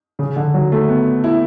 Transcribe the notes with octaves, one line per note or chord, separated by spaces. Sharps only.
C#3
D3
F#3
A3
B3
E4